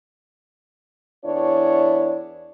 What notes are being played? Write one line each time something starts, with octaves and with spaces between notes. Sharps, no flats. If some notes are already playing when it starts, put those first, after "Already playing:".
E2 D4 E4 C#5